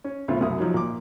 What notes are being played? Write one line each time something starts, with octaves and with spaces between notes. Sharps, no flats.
C#4
B1 C#3 A3 F4 C5
C2 F#2 F#3 D#6
F3 F#3 D#4
A#2 D6